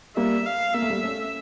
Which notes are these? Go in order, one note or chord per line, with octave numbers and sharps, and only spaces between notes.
G3 A#3 E5
F5
A#3 E5
A3
G3 A#3
A3 C#4